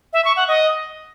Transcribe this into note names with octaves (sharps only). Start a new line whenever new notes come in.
E5
C#6
F#5
D#5